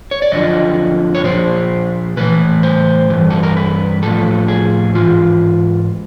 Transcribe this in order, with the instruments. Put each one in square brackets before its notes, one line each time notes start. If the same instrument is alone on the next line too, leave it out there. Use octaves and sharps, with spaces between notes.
[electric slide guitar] C#5
D5
F#2 D3 F3 D#5
C#5
A#2 F3 C5
A2 E3 B4
C5
G2 E3
A4
A#4
B4
A2 F3 A4
G#4
G#2 E3 F4